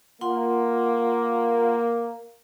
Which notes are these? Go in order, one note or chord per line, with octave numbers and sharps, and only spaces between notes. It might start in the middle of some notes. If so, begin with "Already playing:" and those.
A#3 F4 F#5 C6